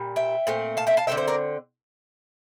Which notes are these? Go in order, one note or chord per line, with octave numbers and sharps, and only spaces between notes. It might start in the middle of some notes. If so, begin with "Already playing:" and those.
Already playing: A#2 G3
E5 G5
A#2 A3 C4
F5 A5
E5 G5
F5 A5
D3 A3 C4 E5 G5
C5 E5
A#4 D5